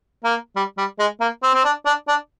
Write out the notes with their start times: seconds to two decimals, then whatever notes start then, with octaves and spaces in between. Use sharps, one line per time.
0.24 A#3
0.56 G3
0.77 G3
0.99 G#3
1.21 A#3
1.43 C4
1.54 C4
1.65 D4
1.86 D4
2.08 D4